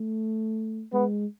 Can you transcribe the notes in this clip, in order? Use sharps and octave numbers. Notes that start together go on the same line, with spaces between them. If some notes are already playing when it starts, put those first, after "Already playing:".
Already playing: A3
G#3 B3